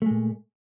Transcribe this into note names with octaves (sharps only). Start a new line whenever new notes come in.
A#2 G#3 A3